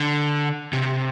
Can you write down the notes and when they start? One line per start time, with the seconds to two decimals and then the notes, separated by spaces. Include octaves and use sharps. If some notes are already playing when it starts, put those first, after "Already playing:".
Already playing: D3
0.73 C3